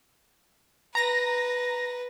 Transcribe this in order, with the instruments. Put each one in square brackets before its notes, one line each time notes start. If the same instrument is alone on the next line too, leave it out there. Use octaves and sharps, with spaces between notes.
[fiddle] B4 [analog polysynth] A#5 A#6